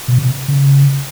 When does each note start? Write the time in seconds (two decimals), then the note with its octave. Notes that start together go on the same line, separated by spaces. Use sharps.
0.08 B2
0.18 C3
0.48 C#3